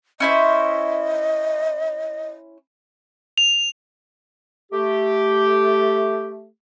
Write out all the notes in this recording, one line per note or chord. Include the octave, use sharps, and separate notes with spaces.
C#4 E4 C5 D#5
F7
A3 G4